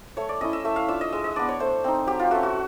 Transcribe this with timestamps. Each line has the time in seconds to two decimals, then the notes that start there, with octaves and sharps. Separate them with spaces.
0.17 A3 C#5
0.29 D5
0.41 C#4 E4 D#5
0.53 E5
0.65 A3 E5
0.76 F5
0.88 D4 F4 E5
1.01 D#5
1.12 G#3 E5
1.24 D#5
1.36 B3 D4 D5
1.48 C#5
1.60 A3 C5
1.84 C4 D#4
2.07 F#3 G4
2.20 F4
2.31 A3 C#4 F#4
2.43 F#4